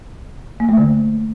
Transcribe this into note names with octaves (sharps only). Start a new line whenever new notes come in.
A#3
A3
D3